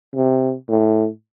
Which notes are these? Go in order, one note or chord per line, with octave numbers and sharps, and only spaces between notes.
C3
A2